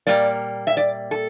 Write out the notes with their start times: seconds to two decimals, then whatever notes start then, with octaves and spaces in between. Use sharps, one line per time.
0.07 A#2 G3 A#3 D5
0.67 E5
0.77 D5
1.11 A4